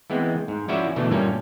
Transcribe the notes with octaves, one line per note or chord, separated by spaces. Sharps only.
E3 G#3 B3 C4
G#2
F3 C#4 E4 F#4 D5 E5
B2 D3 E3 A3
G2 A#2 G3 A#3 C#4